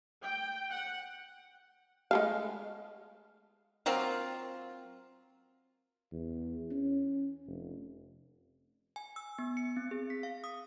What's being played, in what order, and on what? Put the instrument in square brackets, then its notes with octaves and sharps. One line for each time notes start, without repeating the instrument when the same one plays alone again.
[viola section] G5
F#5
[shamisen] G#3 A3 F5
[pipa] F#3 A#3 C4 F4
[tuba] E2
C#4
F1
[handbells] G#5
E6
B3
C#7
C4
G#4
B6
F5
D#6